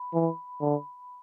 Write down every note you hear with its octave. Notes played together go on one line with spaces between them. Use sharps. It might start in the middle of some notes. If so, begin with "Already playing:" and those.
Already playing: B5
E3
D3